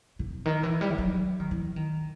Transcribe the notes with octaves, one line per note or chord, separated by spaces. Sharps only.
C3
D#3
E3
G3
E3
F#3
D#3
E3
D#3